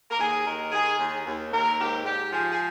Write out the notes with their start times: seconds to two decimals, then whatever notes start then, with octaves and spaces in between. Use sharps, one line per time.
0.11 A#4
0.19 D#2 G#4
0.46 D#3 A#4
0.72 D#3 G#4
0.99 D#2 G#4
1.26 D#2
1.52 D#2 A#4
1.78 G#2 G4
2.05 G#2 G4
2.32 F3 G#4
2.51 G#4